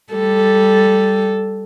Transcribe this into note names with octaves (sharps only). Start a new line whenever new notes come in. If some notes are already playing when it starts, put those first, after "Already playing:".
G3 A4